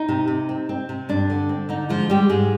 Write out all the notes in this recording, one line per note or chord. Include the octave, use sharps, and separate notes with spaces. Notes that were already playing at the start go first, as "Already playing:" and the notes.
Already playing: D#4
C3
C3
C4
C4
C3
G2 D4
D3
C4
D3 D#4
F3 G#3 F4
G3 G#3 G4
G#2 G#3 G#4